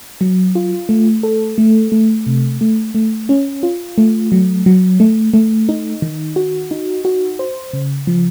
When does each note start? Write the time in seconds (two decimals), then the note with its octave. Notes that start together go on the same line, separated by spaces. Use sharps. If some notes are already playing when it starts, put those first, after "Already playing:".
0.21 F#3
0.55 F4
0.89 A3
1.23 A4
1.58 A3
1.92 A3
2.26 C3
2.61 A3
2.95 A3
3.29 C#4
3.63 F4
3.98 A3
4.32 F#3
4.66 F#3
5.00 A3
5.34 A3
5.69 D#4
6.02 D#3
6.36 F#4
6.71 D#4
7.05 F#4
7.39 C5
7.73 C#3
8.07 F3